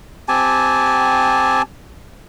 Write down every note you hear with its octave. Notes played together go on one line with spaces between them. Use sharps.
C4 G4 G#5 A5